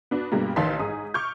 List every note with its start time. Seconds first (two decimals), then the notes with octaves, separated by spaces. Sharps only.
0.11 B3 D4 F#4
0.32 G2 B2 G3 G#3 A#3
0.56 A1 D#3 F5 A5 C6 B6
0.79 G#2 G#4 D#6
1.14 C#6 D6 F6 G6